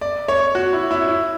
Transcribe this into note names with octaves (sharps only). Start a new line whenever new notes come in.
D5
C#5
F#4
E4
E4
E4